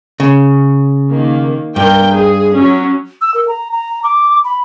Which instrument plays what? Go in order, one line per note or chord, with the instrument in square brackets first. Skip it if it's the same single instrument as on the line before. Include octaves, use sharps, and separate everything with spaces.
[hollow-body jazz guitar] C#3
[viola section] D#3 A#3
[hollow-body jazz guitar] G2 [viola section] A#4 G5
[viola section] G#4
F#3 C#4
[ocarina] E6
A#4
A#5
A#5
D6
B5